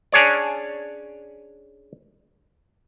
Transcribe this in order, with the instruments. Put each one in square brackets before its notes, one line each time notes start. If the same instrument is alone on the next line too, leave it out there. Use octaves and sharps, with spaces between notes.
[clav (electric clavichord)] C#4 D4 G#4 C#5 D5